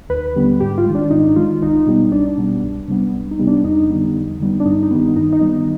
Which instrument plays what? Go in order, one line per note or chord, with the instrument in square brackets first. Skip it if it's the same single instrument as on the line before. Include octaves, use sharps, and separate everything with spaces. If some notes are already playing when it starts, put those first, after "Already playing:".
[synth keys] D#2 B4
D3 G3 B3
G#2 G4
F4
D#3 G#3
D4
G#2 D#4
D#3 G#3 F4
C2 D#4
B2 G3 B3 D#4
C2 D4
B2 G3 B3
C2
C3 G3 B3
C2
D#4
C3 G3 B3
D4
F2 D#4
D3 G3 B3
F2
D3 G3 B3
D4
G2 D#4
D#4
D#3 G3 B3
D#4
G2 D#4
D#4
D#3 G3 B3
D#4